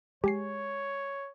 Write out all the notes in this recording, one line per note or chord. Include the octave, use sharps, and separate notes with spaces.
G#3 G4 C#5 G#5 C7